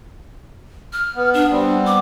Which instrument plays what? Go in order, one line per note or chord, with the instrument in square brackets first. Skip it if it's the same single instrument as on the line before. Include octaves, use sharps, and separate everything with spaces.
[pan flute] F6
[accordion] B3
[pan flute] D4
[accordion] G3 B3 C4
[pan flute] D6